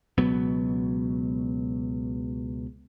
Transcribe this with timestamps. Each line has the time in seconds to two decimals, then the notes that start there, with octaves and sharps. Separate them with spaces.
0.18 C#2 B2 F#3 B3